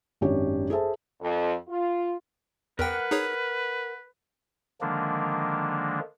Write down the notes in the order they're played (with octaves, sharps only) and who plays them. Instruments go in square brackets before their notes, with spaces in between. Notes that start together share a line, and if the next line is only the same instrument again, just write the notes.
[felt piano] G#1 F#2 D4 G4 C#5
G#4 A4 C5 E5 A5
[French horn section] F2
F4
[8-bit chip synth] E2 G5 [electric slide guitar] A#4 F#5 [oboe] B4
[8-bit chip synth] D#4 G#4 C#5
[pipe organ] D3 D#3 F3 G#3 A#3 D4